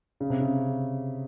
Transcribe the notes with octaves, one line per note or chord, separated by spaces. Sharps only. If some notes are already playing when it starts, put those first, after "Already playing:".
C#3
C3
C#3